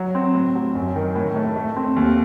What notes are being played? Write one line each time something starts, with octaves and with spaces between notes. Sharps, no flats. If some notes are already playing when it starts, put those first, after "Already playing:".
Already playing: F#3
C4
A2
F#3
F#2
D#3
A2
A3
A3
C4
D#2